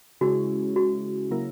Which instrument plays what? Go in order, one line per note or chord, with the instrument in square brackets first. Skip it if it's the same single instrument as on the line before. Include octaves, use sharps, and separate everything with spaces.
[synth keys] C#3 G#3 C#4 E4 G#4 [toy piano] F#4
[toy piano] F#4
[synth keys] C#3 F#3 A#3 E4 A#4